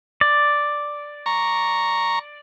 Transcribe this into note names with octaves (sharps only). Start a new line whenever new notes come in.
D5
A#5 C#6